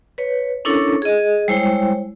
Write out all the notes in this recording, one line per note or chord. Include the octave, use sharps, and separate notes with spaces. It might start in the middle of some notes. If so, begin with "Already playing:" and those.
B4 C#5
C#4 D4 E4 A4 A#4 C#5
G#4 D#5
G3 G#3 E4 C5 C#5 G5